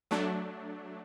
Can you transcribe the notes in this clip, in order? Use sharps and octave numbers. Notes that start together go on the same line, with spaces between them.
F#3 A3 D4